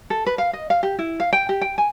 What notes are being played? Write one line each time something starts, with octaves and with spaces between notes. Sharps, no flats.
A4
B4
F5
D#5
F5
G4
E4
F5
G5
G4
G5
G#5